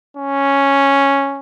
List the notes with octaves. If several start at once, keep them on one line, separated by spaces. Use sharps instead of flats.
C#4